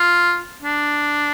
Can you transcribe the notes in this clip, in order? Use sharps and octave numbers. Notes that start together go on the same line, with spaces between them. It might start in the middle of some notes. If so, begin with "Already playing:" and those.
Already playing: F4
D4